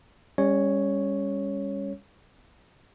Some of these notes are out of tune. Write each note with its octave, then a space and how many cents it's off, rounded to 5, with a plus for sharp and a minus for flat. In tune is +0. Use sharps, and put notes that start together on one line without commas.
G3 +35 C#4 +0 C#5 +0